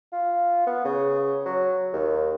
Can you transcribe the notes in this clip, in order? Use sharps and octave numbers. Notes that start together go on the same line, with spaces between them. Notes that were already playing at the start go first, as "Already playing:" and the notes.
F4
B3
C#3
F#3
D#2